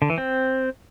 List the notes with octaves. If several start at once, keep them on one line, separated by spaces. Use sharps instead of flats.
D3
E3
C4